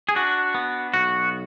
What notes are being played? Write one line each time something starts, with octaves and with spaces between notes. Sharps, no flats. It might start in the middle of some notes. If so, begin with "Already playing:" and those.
G#4
D4 F#4
B3
B1 F#4